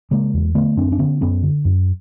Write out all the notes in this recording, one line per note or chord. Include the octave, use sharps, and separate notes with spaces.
C#3 G#3 A#3
E2
D3 A3 B3
F#2 C4 D4
D4
D3 B3 C#4
F#2 B3 C#4
D3
F#2